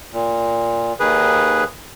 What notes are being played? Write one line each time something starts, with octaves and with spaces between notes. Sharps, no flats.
A#2
D#2 D#3 G#4 B4